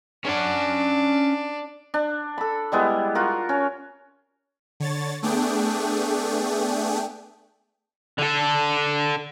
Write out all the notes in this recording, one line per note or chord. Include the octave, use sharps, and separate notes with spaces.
C#4 D4 F#5
D4
A4 B5
G3 G#3 B3 E4
F4 F#4 A#4
C#4
D3 C#5 A6
A3 B3 D4 G#4 G5
D3 A4